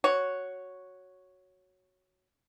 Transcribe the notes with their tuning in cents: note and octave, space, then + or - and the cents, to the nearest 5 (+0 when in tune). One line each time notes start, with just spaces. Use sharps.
F#4 +0 C#5 +0